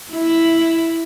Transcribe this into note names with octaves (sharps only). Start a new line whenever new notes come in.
E4